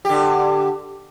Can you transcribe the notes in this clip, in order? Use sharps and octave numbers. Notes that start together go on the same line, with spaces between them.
D3 G4